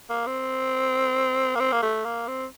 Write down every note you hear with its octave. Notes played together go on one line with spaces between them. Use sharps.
A#3
C4
A#3
C4
A#3
A3
A#3
C4